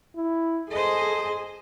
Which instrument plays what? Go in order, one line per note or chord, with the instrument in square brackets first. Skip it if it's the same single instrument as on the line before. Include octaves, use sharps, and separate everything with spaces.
[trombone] E4
[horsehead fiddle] G#4 [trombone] A4 [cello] C5 D#5